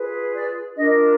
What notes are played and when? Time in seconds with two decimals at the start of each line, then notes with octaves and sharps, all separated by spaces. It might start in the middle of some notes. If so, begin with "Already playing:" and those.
Already playing: F4 G#4 B4
0.35 D5
0.77 D4 F4 A#4 D#5